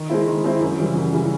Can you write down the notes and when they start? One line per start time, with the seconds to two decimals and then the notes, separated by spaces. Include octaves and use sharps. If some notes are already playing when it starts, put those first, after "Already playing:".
Already playing: D#3
0.09 G#3 C4 E4
0.27 D#3
0.44 G#3 C4 E4
0.61 F#2
0.79 C#3 E3 G3
0.95 F#2
1.13 C#3 E3 G3